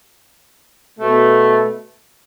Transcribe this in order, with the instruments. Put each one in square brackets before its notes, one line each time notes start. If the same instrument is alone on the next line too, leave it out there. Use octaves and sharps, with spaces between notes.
[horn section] B2 A3